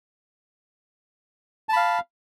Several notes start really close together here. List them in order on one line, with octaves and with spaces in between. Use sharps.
A5 B5 F5